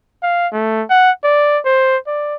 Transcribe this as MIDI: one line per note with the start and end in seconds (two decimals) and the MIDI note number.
0.23 0.48 77
0.53 0.83 57
0.90 1.11 78
1.24 1.59 74
1.65 1.97 72
2.07 2.36 74